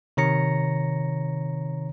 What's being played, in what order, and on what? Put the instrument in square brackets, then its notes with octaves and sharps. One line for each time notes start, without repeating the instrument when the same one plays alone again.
[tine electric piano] C3 D#3 C#5 A#5 A#6 C#7